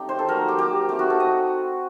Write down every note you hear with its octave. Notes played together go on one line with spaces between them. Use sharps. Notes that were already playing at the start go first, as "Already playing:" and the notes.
Already playing: G3 A3 C4 D#4 G4
C5
A4
F#3 A#3 D#4 A#4
G4
G4
A3 C4 D#4 G4
F#4
A4
D#5